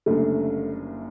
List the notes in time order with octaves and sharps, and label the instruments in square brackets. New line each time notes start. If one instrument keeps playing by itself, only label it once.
[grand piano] F#1 F#2 D3 G3 D4 [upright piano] A3